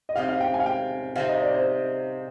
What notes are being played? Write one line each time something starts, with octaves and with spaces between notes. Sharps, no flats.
D#5
C3 G3 C4 D#4 F5
F5
G5
G#5
F5
G5
C3 G3 C4 D#4 F5
D#5
D5
C5